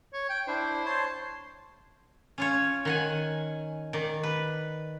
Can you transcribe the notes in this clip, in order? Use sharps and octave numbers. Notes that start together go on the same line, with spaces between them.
C#5
G5
D4 E4 C5
C#5 A5 C6
C#4 F4 C#5
D#3 F#5 G#5
D#3 D5
B4